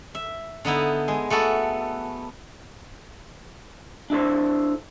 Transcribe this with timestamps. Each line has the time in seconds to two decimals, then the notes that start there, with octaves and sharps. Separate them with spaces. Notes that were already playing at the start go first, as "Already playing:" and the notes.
0.15 E5
0.65 D3 B3 D#4 E4
1.08 G#3
1.30 A3 B3 F#4 A4
4.10 D4 E4 A4 C5